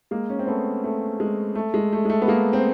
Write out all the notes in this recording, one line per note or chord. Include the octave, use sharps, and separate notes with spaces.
G#3 A#3
C#4
C4
A3 B3
A3
G#3
A3
G#3
A3
G#3
A3
B3
G#3 A#3
C4